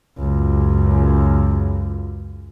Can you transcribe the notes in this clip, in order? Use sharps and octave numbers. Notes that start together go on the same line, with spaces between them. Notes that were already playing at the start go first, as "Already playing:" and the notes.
C#2 F#2